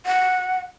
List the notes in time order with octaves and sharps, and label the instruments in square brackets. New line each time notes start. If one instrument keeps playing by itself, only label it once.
[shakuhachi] F#5